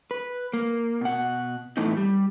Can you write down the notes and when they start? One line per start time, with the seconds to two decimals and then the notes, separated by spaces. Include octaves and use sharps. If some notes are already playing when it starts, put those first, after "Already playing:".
0.11 B4
0.53 A#3
1.01 B2 F#5
1.77 A2 E3 A3 B3 D#4
1.97 G3